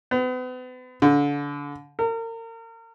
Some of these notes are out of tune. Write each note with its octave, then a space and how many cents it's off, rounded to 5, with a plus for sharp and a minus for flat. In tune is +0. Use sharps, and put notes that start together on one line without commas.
B3 +40
D3 -25
A#4 -35